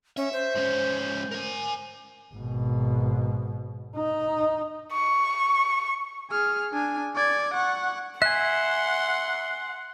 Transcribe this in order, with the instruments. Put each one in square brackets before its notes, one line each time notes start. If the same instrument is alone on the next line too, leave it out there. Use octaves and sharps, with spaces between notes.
[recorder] C#4 [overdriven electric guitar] E5
[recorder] C5
[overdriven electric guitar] G#2 C#4
A#4 G#5
[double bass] G#1 B2
D#4
[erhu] C#6
[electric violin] G#4 F6
D4 G#5
D5 G#6
F#5 C#6
[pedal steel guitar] E5 G#5 [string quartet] F#5 [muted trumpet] C6 [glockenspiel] F#6